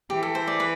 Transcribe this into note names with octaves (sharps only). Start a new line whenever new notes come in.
E3 G4
A4
C5
D5
B4